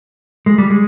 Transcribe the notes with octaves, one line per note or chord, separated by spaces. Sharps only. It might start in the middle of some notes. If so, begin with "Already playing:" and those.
G#3
G3
G#3